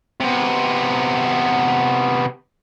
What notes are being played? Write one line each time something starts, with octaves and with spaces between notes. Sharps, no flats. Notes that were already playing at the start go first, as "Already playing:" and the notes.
C3 B3